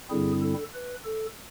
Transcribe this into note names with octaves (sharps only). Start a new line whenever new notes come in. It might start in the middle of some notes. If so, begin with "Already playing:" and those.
G2 D3 G3 C4 E4 G#4
A4
B4
A4